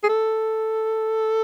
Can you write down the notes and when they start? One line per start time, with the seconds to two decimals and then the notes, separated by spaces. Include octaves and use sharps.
0.04 G#4
0.09 A4